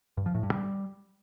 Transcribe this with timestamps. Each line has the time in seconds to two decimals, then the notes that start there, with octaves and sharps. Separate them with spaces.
0.17 G2
0.26 F3
0.34 A2
0.43 G2
0.52 G3